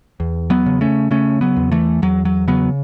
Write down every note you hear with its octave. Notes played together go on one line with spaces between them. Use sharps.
E2
F#3 B3
C#3
A3 C#4
C#3 A3 C#4
F#3 B3
E2
E3 A3
E2 F#3
F#3
C#3 F#3 B3